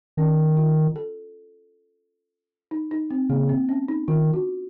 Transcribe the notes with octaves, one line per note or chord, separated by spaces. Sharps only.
D#3 C#4
F4
A4
D#4
D#4
C4
C#3 A#3
C4
C#4
D#4
D#3 F4
F#4